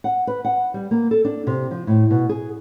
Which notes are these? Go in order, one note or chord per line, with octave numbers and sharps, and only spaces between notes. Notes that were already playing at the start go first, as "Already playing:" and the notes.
F#5
B4
F#5
G3
A#3
A4
D4
C3
F3
A2
B2
G#4